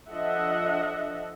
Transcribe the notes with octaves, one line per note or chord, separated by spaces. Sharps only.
F3 D4 A4 D#5 E5 F#5